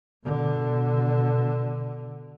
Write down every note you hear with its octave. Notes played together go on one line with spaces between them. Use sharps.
B2 D3